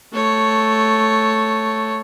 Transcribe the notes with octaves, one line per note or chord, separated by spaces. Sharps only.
A3 C#5